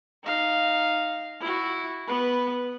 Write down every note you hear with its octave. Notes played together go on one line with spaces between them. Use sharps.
D#4 F5
E4 F#4
B3 B4